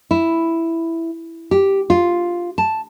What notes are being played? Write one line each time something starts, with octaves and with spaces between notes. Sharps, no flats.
E4
G4
F4
A5